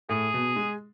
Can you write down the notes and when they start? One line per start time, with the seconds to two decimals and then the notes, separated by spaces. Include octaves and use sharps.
0.09 A2 G#4
0.34 B2
0.56 G#3